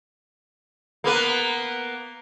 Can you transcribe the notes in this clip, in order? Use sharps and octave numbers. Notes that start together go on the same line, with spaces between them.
A#3 B3 B4